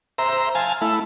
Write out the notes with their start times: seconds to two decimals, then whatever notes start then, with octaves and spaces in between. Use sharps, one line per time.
0.18 C5 E5 A#5
0.55 F5 G#5 A5
0.81 A3 E4